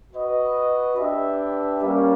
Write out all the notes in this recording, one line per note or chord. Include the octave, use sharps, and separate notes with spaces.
F#4 B4 D#5
D4 G4 B4 E5 G5
G3 A#3 C#4